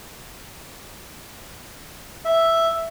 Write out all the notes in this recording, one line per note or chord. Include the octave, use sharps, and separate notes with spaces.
E5